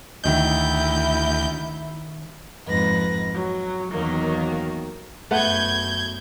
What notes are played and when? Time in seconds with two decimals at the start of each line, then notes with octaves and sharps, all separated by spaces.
0.24 D2 D#3 D#4 E4 G6
2.66 F2 G#2 B4 A#6
3.34 F#3
3.91 E2 D#3 F#3 A#3
5.31 F#2 A3 B3 F#5 G6 G#6